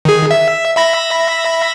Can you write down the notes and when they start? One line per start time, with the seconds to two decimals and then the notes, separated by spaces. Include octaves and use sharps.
0.05 D#3 G#4
0.31 E5
0.76 E5 B5 A#6